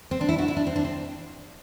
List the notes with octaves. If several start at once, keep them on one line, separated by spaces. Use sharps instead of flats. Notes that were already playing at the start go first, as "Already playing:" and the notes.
C4
D4
E4
F#4
E4
D4
C4
D4
C4